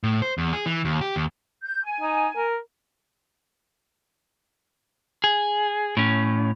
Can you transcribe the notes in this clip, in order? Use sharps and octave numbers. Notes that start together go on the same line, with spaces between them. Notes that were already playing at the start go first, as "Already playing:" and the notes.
A2
C5
E2
G#4
E3
D#2
G4
D#2
G6
G#5
D#4
A#4
G#4
A2 C#4